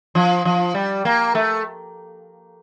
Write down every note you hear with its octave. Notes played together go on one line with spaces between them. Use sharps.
F3
F3
G3
A#3
A3